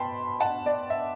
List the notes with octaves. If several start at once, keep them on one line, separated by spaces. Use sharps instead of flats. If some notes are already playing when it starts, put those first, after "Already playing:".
Already playing: B2 G5 A5 B5 C6
F#5 A5
D5
E5